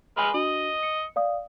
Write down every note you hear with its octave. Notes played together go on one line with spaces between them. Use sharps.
G#3 B4 G#5 B5 F6
D4 F#4 D#5 F#7
C#7
D5 F5 D#6